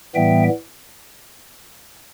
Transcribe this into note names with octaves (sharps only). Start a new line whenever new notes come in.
A2 E3 G3 B3 E5 G5